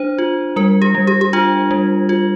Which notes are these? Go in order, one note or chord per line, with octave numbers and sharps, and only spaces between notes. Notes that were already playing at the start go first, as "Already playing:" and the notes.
Already playing: D4 C5
F4
G3 A#4
G4
G3
G4
G4
D4 F4
G3
F4